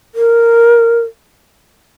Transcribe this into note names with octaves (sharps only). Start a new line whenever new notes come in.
A#4